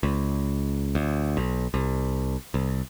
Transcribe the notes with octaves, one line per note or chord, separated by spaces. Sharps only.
C#2
D2
B1
C2
C2